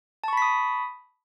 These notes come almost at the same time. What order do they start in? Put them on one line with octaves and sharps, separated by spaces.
A5 C#6 B5 B6 D#6